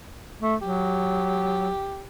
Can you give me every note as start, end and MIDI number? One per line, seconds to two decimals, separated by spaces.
0.42 0.55 57
0.61 1.70 54
0.61 2.08 67